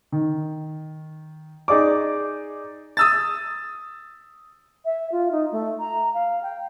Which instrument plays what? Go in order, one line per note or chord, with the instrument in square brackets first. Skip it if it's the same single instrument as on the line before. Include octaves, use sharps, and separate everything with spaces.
[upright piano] D#3
D#4 G#4 D5 D6
[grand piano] D#6 E6 A6
[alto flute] E5
F4
D#4
A3
A#5
F5
G5